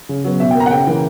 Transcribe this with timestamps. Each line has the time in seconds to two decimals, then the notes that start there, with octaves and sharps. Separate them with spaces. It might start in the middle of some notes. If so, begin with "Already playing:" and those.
0.09 C#3
0.24 F#3 B3
0.40 B2 E5
0.51 G5
0.55 A#3
0.60 A#5
0.66 F#5
0.71 C#3 G5
0.87 E3 A#3